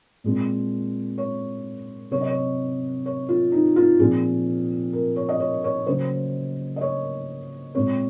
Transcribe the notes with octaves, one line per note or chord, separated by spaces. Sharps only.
A#2 G#3 C4
C#5
C3 F#3 C4 C#5
D#5
C#5
C#5
F4
D#4
F4
A#2 F3 C4 G#4
A#4
C#5
D#5
C#5
C#5
C#3 F#3 A#3 C5
D#5
C#5
A#2 G#3 C4 C#5